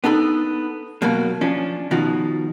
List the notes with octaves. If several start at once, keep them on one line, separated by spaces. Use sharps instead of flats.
B3 D4 D#4 A4
B2 F#3 A#3
F3 C#4 D4
B2 D#3 F3 F#4